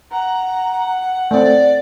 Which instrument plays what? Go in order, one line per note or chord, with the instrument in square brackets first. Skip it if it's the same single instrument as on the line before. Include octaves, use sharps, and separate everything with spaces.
[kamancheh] F#5 [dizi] A#5
[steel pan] A3 C4 [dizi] D5